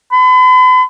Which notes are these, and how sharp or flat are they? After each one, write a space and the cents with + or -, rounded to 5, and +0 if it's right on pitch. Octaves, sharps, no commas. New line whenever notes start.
B5 +40